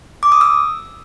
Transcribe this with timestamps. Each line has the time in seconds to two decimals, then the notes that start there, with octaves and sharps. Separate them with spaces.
0.23 D6
0.32 D#6
0.41 E6